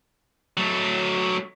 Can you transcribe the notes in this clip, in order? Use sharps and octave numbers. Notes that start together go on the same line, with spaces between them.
F#3 A3